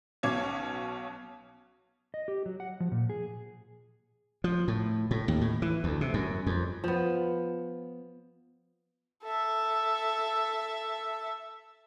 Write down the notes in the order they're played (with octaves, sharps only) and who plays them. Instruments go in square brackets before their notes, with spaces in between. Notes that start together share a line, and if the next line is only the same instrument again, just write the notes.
[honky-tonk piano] B1 B2 C#4 D6 G#6
[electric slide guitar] D#5
G4
F#3
F#5
F3
A#2
G#4
[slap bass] F3
A2
A2
D#2
A2
E3
D2
C3
F#2
F2
[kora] F3 B3
[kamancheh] A4 E5